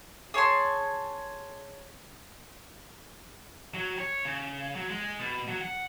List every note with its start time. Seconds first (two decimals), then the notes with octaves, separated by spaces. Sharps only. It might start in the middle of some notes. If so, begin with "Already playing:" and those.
0.34 G#4 C#5 A5 C6
3.74 F#3
3.99 C#5
4.25 C#3
4.76 F#3
4.90 G#3
5.19 B2
5.48 F#3
5.61 F#5